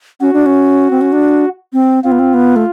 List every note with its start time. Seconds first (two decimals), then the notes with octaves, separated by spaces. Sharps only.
0.21 C#4 F#4
0.33 D4
0.46 C#4
0.91 C4
1.01 C#4
1.12 D4
1.73 C4
2.04 C4 F4
2.12 B3
2.19 C4
2.34 B3
2.56 A3